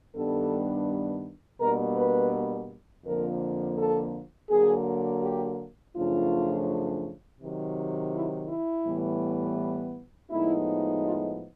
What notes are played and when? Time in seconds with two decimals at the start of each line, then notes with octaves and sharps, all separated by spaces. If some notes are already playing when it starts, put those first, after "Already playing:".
0.15 G2 D#3 G3 B3 D4 A4
1.60 B2 G3 A#3 D4 A#4
1.97 B4
3.05 F2 D3 F3 A#3 A#4
3.78 A4
4.50 D3 F#3 A#3 G#4
5.22 G4
5.95 F#2 C#3 F3 A3 D4 F4
7.40 C3 D#3 F#3
8.14 E4
8.49 E4
8.85 A2 E3 G3 B3
10.30 A2 F3 G#3 B3 D#4 E4
11.03 F4